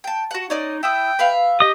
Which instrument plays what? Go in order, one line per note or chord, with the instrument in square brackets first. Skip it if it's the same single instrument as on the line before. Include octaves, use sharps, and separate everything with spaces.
[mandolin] G5 A5
F#4 F#5
[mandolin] C#4 D5 D#5 [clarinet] D#4
[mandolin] E4 E5 D#6 [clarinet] G5
[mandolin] B4 E5 F5
[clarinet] G4 [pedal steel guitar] D#5 D#6